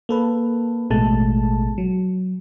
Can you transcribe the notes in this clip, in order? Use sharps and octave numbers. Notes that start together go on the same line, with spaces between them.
A#3 A4 B4
A1 B2 G#3 A3 A5
F#3